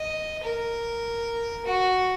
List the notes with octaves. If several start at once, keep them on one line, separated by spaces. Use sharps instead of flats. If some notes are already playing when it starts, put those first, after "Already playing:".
Already playing: D#5
A#4
F#4